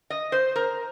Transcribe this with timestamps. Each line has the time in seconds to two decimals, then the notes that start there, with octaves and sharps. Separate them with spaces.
0.10 D#5
0.32 C5
0.56 A#4